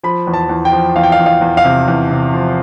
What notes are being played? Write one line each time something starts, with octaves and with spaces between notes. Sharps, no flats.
F3 B5
E2
A5
E2
G5
F3
E2 F5
G5
F5
E2
F5
E2
F5
C3
E2
C3
F3